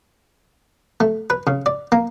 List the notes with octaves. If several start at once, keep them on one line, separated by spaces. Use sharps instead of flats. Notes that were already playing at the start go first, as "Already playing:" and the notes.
A3
B4
C#3
D5
A#3